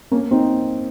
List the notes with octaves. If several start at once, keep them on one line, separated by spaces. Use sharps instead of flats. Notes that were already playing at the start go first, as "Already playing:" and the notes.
A#3 C#4
C4 D#4